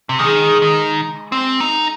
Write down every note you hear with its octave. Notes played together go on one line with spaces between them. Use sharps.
C3
D#3 G#3 G#4
D#3
C4
D#4